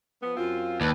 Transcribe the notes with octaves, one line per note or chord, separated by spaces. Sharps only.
F3 B3
F#2 C4 F4
D#2 D4 B4